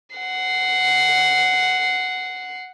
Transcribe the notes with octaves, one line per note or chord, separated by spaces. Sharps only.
F#5 C7